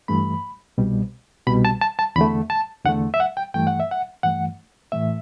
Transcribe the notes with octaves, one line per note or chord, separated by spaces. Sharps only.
G2 E3 A3 B5
C2 B2 G3
C2 B2 G3 B5
A5
A5
A5
E2 D3 A3 B5
A5
E2 D3 A3 F#5
E5
F#5
G5
G2 E3 A3 G5
F#5
E5
F#5
G2 E3 A3 F#5
A2 E3 A3 E5